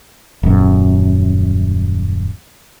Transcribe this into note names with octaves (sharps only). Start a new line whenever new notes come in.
D#1 F#2